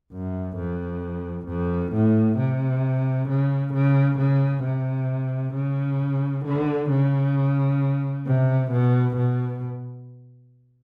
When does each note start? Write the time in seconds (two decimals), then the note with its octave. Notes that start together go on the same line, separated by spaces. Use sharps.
0.13 F#2
0.57 F2
1.48 F2
1.93 A2
2.39 C3
3.29 C#3
3.74 C#3
4.19 C#3
4.64 C3
5.55 C#3
6.45 D3
6.90 C#3
8.27 C3
8.72 B2
9.17 B2